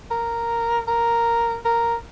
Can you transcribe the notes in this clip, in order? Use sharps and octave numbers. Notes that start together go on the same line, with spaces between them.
A#4
A#4
A#4